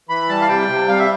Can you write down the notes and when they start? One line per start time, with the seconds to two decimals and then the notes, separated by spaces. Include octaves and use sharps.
0.09 E3 B5
0.29 G3 A5
0.41 F5
0.48 C3 G5
0.68 C3
0.88 G3 F5
0.99 E5